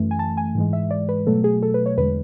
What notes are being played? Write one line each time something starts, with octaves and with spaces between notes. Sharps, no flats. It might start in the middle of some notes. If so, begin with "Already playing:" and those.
Already playing: F#2 E3 A3
G#5
A5
G#5
G#2 E3 G#3
E5
D5
B4
B2 F#3 A3 A4
G#4
A4
B4
C#5
E2 D3 G#3 B4